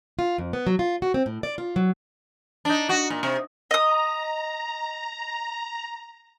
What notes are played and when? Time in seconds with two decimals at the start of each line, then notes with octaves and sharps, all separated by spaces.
0.19 F4
0.38 F2
0.53 B3
0.67 F#3
0.79 F4
1.02 F#4
1.14 C4
1.26 A2
1.43 D5
1.58 F4
1.76 F#3
2.65 D4 D#4
2.89 F#4
3.10 A#2
3.23 C3
3.71 D#5 A#5 D#6